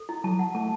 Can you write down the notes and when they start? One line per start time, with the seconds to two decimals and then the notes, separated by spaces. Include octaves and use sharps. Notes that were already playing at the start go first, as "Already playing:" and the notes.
Already playing: A4
0.09 E4
0.24 F#3 A5
0.39 F#5
0.55 A3 A5